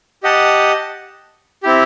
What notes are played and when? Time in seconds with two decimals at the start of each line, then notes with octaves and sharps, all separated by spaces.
0.23 G4 D#5 F#5 A5
1.63 C4 E4 G4